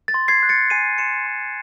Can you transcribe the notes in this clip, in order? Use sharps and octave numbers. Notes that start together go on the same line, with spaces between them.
A6
C6
G#6 C7
F#6
A6 C#7
G#5 C7 D#7
C6 C#7 E7
C6